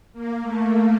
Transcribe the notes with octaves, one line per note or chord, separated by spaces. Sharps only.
A#3
A3